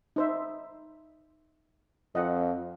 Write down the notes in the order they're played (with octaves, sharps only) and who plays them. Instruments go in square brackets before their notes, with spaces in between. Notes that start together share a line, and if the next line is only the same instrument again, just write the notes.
[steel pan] D#4 C5 E5
[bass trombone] F2 [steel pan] D#5 F#5